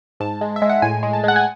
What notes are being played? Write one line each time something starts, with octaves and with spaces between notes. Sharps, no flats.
G#2 A5
G#3
E5
G#3
F#5
A2 G#5
G#3
A5
G#3 F#5
G#5